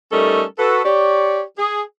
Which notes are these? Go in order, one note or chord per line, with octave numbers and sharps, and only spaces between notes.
G3 A3 C#4 D#4 A4 A#4
F#4 A4 B4
G4 C#5 D5
G#4